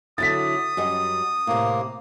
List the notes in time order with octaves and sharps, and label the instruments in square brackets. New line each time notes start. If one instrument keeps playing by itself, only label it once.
[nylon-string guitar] D3 F#3 E4 [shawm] D#6 [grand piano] A6 B6
[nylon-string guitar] F#2 G3 D#5
[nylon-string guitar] A2 C3 [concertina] A#3